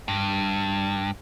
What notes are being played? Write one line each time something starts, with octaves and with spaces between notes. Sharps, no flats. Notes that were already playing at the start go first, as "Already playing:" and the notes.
G2